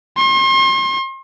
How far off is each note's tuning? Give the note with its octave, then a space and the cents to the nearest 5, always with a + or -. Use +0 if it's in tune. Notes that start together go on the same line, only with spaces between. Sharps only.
C6 +40